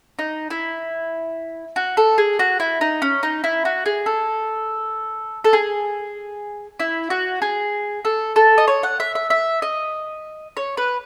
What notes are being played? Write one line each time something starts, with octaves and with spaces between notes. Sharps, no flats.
D#4
E4
F#4
A4
G#4
F#4
E4
D#4
C#4
D#4
E4
F#4
G#4
A4
A4
G#4
E4
F#4
G#4
A4
A4
D#5
C#5
F#5
E5
E5
E5
D#5
C#5
B4